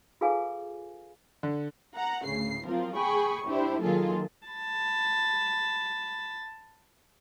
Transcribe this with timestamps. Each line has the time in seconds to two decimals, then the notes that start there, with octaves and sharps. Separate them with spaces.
0.21 F4 G#4 A4 B4 F5 G#5
1.43 D3
1.95 F#5 A#5
2.25 D2 A2 C#3 C7
2.65 F3 F#3 C4 F4 A#4
2.96 G#4 G5 G#5 B5 C#6
3.47 D4 E4 G4 C5
3.82 D#3 F#3 A#3 F4 G#4 A4
4.48 A5 B5